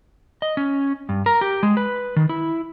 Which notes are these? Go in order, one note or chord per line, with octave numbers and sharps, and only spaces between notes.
D#5
C#4
G2
A#4
G4
G#3
B4
D#3
E4